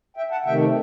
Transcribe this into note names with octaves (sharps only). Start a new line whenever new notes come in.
E5 G5
F#5 A5
C3 D#3 A3 E5 G5